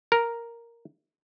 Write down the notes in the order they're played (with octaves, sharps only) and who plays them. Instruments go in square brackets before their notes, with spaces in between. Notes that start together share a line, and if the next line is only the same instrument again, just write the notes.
[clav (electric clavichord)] A#4